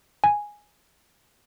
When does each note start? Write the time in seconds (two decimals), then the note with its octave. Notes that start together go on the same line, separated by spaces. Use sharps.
0.24 G#5